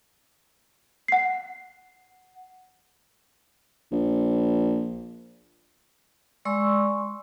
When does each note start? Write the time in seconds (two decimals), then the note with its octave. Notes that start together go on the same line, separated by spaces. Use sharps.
1.08 F#5 C7
3.92 A#1
6.45 G#3 D5 C6 C#6 E6